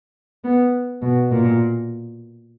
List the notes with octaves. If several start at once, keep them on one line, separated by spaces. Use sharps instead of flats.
B3
B2
A#2